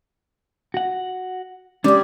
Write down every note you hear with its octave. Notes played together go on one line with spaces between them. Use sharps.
F#4 F#5
G3 G#3 C#4 D4 G#4 D6